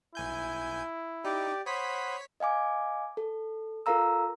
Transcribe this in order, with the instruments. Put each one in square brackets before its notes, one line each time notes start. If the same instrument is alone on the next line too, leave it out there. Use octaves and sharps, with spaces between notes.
[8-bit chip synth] B1 G#5 G6 [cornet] E4
[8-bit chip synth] D#4 [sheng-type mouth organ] G4 D5
[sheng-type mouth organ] C5 B5 D#6 [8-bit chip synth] C#5 B6 [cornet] F#5
[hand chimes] D#5 F5 G#5 D6
A4
F4 A4 A#4 F5 A#5 E6